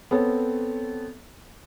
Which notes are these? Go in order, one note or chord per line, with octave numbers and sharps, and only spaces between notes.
B3 C4 A4 C#5